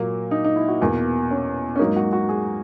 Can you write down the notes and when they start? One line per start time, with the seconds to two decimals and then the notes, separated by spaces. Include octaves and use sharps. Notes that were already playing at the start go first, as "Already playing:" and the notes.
Already playing: A#2 F#3 A#3
0.31 D#4
0.44 D#4
0.56 E4
0.68 F#4
0.81 E2 B2 A#3
1.31 C#4
1.76 C#4
1.79 G#2 F#3 A#3 D#4
1.96 F#4
2.13 F#4
2.29 G#4